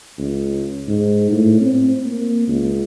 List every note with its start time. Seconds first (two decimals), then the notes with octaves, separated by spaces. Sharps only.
0.18 C#2
0.88 G#2
1.31 A2
1.61 C4
2.05 A#3
2.48 C#2